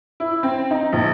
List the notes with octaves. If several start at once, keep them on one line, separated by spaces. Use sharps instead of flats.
E4
C4
D#4
A#1